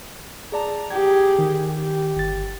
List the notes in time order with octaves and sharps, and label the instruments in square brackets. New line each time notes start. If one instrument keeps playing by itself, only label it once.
[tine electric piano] G#4 D5 A5 [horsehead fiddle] A#5
[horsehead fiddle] G4 G#4 [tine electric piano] G#6
[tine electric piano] D#3
[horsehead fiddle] G4
[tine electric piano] G1 A6